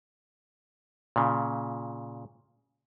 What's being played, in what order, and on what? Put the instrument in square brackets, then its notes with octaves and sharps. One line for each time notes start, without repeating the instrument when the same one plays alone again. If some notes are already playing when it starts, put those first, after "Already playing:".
[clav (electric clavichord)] A#2 C#3